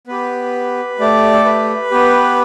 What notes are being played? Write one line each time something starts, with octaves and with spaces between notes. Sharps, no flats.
B3 G4 B4
A3 G4 D5
A4
B4
B3 G4